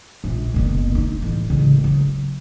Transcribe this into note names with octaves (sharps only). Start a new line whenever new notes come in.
A#1
F#1 B2
D#4
A1
A1 C#3
F#3